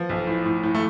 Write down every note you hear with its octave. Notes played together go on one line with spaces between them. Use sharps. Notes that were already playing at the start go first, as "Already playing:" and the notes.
Already playing: F3 B3
B1
A2
A2
A2
A3